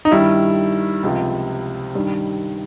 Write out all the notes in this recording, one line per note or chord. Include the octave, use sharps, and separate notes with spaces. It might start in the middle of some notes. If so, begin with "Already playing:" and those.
D#4
G2 D#3 G3 E4
C#2 C3 F3
G2 D#3 G3